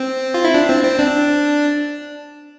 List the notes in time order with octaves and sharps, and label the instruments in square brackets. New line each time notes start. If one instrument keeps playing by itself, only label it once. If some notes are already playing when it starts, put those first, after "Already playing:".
Already playing: [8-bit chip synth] C4
F4
E4
D4
C4
C4
D4